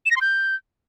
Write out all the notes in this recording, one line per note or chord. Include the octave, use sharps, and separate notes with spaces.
E7
A#6
C6
G6